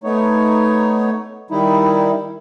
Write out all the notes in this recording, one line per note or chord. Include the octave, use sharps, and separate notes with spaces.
A3 B3 D#4 C#5
D#3 G3 D#4 E4